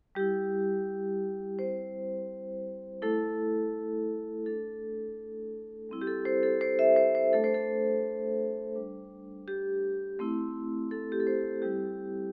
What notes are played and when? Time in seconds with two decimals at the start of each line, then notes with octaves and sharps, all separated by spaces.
0.15 G3 E4 G4
1.59 G3 C4 E4 C5
3.02 A3 E4 A4
4.46 A3 D4 A4
5.89 G3 C4 E4
6.01 G4
6.07 A4
6.25 C5
6.43 A4
6.61 C5
6.79 E5
6.96 C5
7.15 C5
7.32 A3 D4 A4
7.44 C5
7.54 A4
8.76 G3 D4
9.48 G4
10.19 A3 C4 E4
10.91 A4
11.12 G4
11.20 A4
11.27 C5
11.62 G3 C4 E4 G4